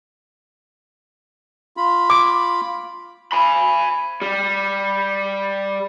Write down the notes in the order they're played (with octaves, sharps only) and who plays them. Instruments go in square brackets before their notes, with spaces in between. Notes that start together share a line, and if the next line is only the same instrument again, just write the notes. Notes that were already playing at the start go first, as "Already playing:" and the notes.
[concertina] F4 B5
[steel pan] D6
[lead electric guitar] G#5 B5
G3